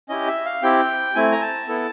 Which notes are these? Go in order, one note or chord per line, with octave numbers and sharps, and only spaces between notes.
C#4 E4 G4 D#5
E5
F5
C4 E4 G4 G5
A3 C4 E4 G#5
A#5
A5
B3 E4 A4